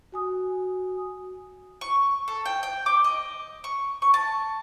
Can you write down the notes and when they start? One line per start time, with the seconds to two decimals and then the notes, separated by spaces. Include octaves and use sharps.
0.12 F#4 G#5 D#6
1.81 C#6
2.28 A4
2.46 G5
2.63 G5
2.86 D6
3.04 D#5
3.64 C#6
4.02 C#6
4.14 A5